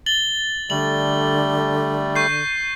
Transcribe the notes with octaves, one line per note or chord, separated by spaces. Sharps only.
A6 F#7 G7
D3 G3 A3 F#7
C#6 G6 C7